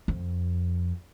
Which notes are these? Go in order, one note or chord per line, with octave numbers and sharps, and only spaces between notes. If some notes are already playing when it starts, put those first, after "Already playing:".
F2